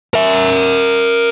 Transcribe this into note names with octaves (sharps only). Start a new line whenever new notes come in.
A#4 E5